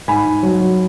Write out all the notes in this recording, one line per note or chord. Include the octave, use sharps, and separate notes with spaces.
G#2 G#5 B5
G#2
F#3
F#3